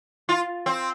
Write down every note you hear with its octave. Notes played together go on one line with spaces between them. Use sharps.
F4
C4